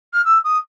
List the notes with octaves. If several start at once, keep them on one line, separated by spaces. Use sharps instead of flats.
F6
E6
D#6